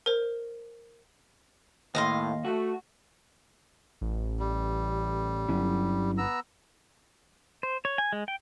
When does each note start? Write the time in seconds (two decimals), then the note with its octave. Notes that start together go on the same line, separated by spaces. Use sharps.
0.06 A#4 C5
1.95 D#2 A2 D#5 F5 C6
2.45 A3 F#4
4.01 A1
4.40 G3
5.49 G1 F#3 C#4 E4
6.18 B3 A#5 E6
7.63 C5
7.85 C#5
7.98 G#5
8.13 G#3
8.28 G5